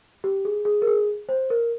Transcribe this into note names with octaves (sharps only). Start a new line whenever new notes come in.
G4
G#4
G#4
A#4
G#4
C5
A#4